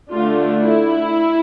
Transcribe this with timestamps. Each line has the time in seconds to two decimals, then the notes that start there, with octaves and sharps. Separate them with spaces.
0.11 D3 A3 D4 F4
0.64 E4